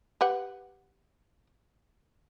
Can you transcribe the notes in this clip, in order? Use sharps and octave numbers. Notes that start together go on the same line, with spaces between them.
G4 B4 F#5